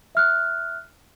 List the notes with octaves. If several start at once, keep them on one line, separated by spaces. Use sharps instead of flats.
E5 F6 F#6